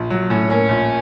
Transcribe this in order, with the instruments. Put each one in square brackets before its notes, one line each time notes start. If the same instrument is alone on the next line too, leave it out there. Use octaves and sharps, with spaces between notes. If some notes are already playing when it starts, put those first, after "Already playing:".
Already playing: [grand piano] A#1
F#3
[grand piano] A2 [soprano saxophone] C#4
[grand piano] A#3 [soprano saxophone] C#4
[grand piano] A#1